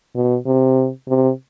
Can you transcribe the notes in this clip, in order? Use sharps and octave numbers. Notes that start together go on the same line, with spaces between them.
B2
C3
C3